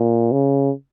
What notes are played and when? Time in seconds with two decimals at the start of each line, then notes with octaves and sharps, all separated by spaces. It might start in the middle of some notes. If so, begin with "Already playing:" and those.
Already playing: A#2
0.32 C#3